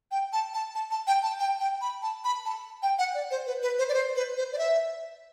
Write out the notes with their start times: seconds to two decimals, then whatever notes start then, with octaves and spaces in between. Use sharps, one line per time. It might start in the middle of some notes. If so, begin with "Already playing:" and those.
0.11 G5
0.33 A5
0.54 A5
0.75 A5
0.91 A5
1.07 G5
1.23 A5
1.40 G5
1.60 G5
1.81 B5
2.02 A5
2.24 B5
2.45 A5
2.83 G5
2.99 F#5
3.14 D5
3.31 C5
3.47 B4
3.62 B4
3.78 C5
3.89 D5
3.94 C5
4.16 B4
4.37 C5
4.53 D5
4.58 E5